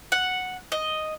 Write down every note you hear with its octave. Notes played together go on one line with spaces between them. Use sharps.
F#5
D#5